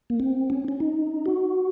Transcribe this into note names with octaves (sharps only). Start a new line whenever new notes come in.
A#3
C4
C#4
C#4
D#4
F#4